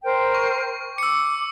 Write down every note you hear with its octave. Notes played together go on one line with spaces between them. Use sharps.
A#4 C5 G5
C#6
D6 E6 C#7